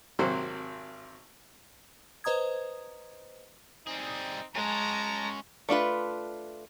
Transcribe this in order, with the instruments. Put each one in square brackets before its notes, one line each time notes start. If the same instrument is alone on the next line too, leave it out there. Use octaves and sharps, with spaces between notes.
[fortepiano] G#1 C3 F#3 A#3 C5
[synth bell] B4 C5 D#5 A#5 D#6 G#6
[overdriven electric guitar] G3 G#4 [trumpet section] C4 D#4
[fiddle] G#3 [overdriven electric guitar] C#4 F#4 [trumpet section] A5 A#5
[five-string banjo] A3 D4 F4 B4